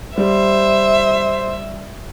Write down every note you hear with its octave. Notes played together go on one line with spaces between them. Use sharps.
G3 C5 E5